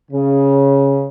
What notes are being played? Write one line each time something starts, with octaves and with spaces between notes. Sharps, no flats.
C#3